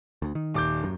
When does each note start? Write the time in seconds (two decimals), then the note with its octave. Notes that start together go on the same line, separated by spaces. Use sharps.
0.22 D2
0.35 D#3
0.54 D#1 D6 G6
0.84 F#2